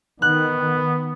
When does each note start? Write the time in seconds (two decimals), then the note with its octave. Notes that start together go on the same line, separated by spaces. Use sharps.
0.22 D#3 B3 F#6